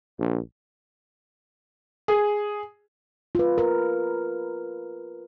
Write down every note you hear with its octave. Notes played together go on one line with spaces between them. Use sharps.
A#1
G#4
F4 B4
A#4